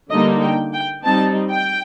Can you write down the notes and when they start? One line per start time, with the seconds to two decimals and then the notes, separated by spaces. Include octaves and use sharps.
0.10 D3 G3 A#3 D#4 D#5
0.41 G5
0.73 G5
1.04 G3 C4 D#4 A5
1.51 G5